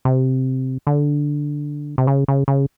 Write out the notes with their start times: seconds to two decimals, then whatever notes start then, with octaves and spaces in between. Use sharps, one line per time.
0.05 C3
0.87 D3
1.98 C3
2.07 C#3
2.28 C#3
2.48 C#3